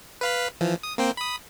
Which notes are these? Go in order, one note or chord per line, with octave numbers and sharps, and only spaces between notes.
B4 F5 B5
E3 F3
D#6
A#3 C4 G5
B5 D#6